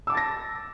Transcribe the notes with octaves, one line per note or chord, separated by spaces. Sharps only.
A5 D6 E6 A6 A#6